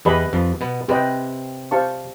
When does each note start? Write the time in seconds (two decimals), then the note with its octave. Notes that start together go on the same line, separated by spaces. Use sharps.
0.05 E2 E3 G4 B4 D#5 G#5 B5
0.33 F2 F3
0.61 B2 B3
0.88 C3 C4 G4 B4 D#5 G5
1.71 G4 C5 F5 A5 C#6